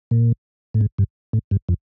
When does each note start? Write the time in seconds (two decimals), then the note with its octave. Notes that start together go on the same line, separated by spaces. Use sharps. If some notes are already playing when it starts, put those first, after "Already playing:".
0.11 A#2
0.74 A2
0.81 G#2
0.98 G2
1.33 A2
1.51 G2
1.69 F2